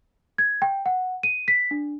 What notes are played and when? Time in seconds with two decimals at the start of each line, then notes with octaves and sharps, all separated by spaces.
0.38 G#6
0.62 G5
0.86 F#5
1.23 D#7
1.48 B6
1.71 D4